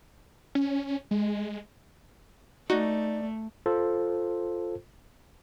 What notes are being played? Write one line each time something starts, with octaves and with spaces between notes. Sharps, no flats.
C#4
G#3
A3 D#4 F#4 D5
F4 A4 C5